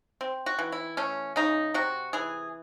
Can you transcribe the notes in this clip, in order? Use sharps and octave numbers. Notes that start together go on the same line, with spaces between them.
C4
F#4
E3
E4
A3 C#4
C#3 D#4
C3 F#4
E3 G#4